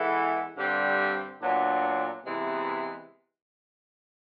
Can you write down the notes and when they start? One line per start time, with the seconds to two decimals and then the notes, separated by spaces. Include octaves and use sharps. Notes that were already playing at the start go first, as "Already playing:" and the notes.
Already playing: E3 G#3 B3 E4 A4
0.56 G2 D3 G3 C4
1.40 A#2 F#3 B3 D4
2.25 C3 E3 G#3 B3